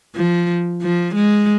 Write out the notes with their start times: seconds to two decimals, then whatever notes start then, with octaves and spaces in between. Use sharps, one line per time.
0.15 F3
0.82 F3
1.15 G#3